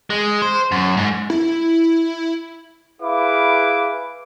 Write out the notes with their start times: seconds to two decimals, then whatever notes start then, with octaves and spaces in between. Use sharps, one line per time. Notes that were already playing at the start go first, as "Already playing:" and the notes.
0.10 G#3
0.42 C5
0.72 F#2
0.97 G#2
1.30 E4
3.01 E4 G#4 B4 F5 D6